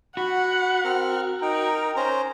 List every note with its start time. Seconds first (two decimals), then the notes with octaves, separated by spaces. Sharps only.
0.17 F#4 F#5 B5
0.85 C4 A#4 F6
1.42 D#4 A#4 G5
1.96 C#4 C5 A#5